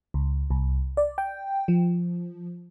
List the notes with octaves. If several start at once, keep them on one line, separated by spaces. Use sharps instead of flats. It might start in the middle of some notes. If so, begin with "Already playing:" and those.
C#2
C2
D5
G5
F3